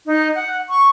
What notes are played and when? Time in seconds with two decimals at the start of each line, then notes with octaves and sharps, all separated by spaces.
0.06 D#4
0.35 F#5
0.69 C#6